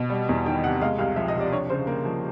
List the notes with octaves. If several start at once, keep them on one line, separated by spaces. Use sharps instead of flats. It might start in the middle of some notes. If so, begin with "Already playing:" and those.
Already playing: B2
G3
E2
D#3 G5
C3 F#5
G#3 F5
C2 F5
F3 E5
D#5
C3
D5
D4 C#5
C#3 C5
A#3
F3